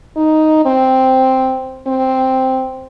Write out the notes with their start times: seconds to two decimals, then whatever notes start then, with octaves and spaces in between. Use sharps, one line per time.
0.16 D#4
0.65 C4
1.87 C4